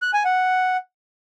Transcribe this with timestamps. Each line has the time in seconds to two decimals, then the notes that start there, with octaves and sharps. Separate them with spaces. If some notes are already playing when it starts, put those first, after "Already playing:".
0.02 F#6
0.13 G#5
0.25 F#5